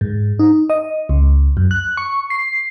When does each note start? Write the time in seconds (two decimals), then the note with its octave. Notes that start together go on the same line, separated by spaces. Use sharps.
0.01 G#2
0.39 D#4
0.70 D#5
1.09 C#2
1.57 F#2
1.71 F#6
1.97 C#6
2.30 C7